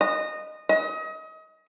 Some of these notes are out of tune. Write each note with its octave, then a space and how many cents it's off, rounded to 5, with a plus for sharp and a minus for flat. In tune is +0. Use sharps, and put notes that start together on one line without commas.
D#5 -15
D#5 +30